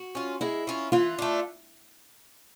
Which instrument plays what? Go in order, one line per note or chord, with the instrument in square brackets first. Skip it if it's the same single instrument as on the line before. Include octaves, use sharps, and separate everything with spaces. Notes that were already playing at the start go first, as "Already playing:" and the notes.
Already playing: [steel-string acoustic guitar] F#4
[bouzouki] C#4 F4
[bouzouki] G#3 [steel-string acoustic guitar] E4
[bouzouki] C#4 F4
[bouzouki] E3 [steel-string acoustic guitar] F4
[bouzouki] A3 D4